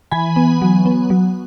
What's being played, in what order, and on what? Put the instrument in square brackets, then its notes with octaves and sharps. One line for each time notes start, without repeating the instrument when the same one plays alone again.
[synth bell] E3 G#5 B5
B3
F#3
B3
F#3